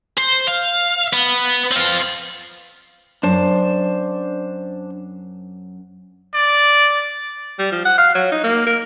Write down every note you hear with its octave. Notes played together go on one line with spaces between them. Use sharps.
C5
F5
B3
C4 F4
F#2 D4 C5 A5
D5
G3
F3
F#5
F5
F#3
D#4
A#3
A#4